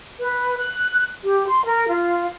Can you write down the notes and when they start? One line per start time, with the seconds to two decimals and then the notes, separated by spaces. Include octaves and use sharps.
0.20 B4
0.58 F#6
1.23 G4
1.47 C6
1.65 A#4
1.87 F4